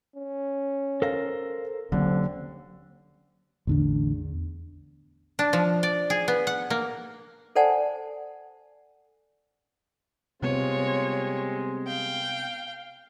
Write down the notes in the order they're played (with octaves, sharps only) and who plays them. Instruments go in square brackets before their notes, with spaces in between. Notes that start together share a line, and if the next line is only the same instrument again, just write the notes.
[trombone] C#4
[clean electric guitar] A4 A#4 C5 [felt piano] F5 A#6
[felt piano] D#2 D3 [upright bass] F#3 C#4 [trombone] C4
[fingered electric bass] A1 D3 D4 [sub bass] E2
[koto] D4
F3
D5
G#4
B3
F#5
A#3
[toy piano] A4 C5 D5 F#5 G#5 A5
[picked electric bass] C3 B3 [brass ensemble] G3 G#3 C4 [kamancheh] F4 C#5
[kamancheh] F5 [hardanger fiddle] G5